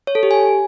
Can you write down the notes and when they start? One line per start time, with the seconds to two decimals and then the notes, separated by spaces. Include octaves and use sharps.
0.07 C#5
0.15 A4
0.23 G4
0.31 G#5